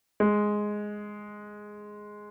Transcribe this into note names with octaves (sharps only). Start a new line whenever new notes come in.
G#3